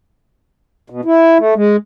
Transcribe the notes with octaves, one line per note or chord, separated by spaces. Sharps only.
B2
E4
A3
G#3